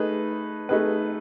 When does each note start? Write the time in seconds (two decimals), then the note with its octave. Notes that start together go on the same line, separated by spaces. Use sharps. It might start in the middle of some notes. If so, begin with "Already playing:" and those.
Already playing: A3 D#4 G#4 B4
0.69 A3 D#4 G#4 B4